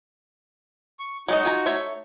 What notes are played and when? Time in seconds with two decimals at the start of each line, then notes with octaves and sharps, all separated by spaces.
0.99 C#6
1.28 F#3 G#3 D#4 F#4 D#5
1.45 F4 G#5 A#5
1.66 A3 C#5 E5